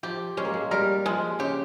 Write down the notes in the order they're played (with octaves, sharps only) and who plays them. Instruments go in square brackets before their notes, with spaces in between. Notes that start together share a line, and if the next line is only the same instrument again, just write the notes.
[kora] F3 [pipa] G4
[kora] G#3 [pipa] C#4
[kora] A#3
G#3
[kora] G3 [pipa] A#4
[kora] F3 [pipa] G#3
[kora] C#3 [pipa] G4